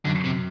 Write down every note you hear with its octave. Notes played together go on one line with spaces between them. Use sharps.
F#2 D3
C3